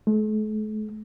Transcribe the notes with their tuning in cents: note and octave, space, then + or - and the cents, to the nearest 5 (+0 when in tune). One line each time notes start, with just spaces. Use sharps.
A3 -45